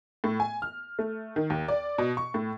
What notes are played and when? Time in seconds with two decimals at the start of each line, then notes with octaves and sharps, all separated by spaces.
0.24 A2
0.40 G#5
0.62 F6
0.99 A3
1.36 D#3
1.50 D#2
1.68 D5
1.98 B2
2.17 C#6
2.34 A2